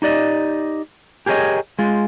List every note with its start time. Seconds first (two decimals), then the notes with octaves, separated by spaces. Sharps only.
0.02 D#4 G4 D5 D#5
1.26 G4 G#4 A#4 C#5 D#5
1.79 G#3 F4